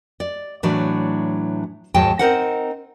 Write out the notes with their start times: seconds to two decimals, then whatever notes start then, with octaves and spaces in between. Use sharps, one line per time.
0.20 D5
0.63 A2 E3 F#3 D4 D5
1.94 D#2 G#2 F#3 G#3 G5 A5
2.19 C4 D#4 A#4 C5 F#5